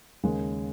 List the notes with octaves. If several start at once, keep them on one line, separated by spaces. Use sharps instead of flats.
D#2 C#3 G#3